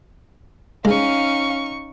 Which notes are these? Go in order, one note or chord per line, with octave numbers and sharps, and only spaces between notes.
G#3 C#4 D#4 F5 C#6